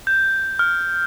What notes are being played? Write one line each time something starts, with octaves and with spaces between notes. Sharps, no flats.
G6
F6